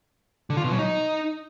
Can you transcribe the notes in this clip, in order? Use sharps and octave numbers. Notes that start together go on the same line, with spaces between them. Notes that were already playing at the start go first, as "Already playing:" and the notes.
D3
F4
B2
F#3
D#4